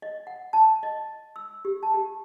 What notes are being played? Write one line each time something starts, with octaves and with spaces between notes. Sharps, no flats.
D#5
F#5
A5
D#5
E6
G4
A5
G4